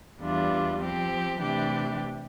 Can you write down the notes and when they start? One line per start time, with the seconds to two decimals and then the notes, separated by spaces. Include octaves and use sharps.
0.21 E2 E3 G3 D4 F4
0.79 F3 C4 G4
1.39 C3 E3 A3 D4 G4